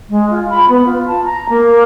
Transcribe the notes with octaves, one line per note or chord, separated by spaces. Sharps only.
G#3
F4
B5
B3
F4
A5
A#5
A#3